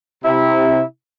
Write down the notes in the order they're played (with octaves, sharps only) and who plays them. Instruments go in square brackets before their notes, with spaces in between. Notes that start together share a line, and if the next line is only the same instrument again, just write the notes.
[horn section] C3 E4